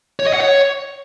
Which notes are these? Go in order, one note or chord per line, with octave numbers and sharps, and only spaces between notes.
C#5
D#5
F#5
C#5